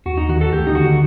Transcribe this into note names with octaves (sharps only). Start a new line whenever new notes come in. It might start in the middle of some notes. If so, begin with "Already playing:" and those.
D#2 F#4
D#4
D#3 F#4
A4
D2 G4
D#4
D3 F#4